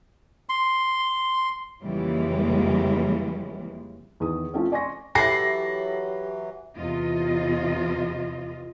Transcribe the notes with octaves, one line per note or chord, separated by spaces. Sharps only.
C6
F2 C#3 E3 G3 G#3 A#3
E2 D#3 D#6
F3 A3 C4 C#4
D5 G#5 C6 C#6 A#6
E3 F#3 E4 G4 A4 A#6 C7
E2 C3 E3 F4 D#5